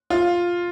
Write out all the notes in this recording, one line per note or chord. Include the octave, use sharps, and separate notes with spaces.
F4